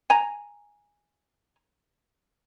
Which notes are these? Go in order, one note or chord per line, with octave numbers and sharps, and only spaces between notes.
G#5 A#5